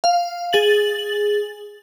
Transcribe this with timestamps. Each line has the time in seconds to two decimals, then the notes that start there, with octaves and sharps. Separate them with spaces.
0.04 F5
0.53 G#4 A6 F#7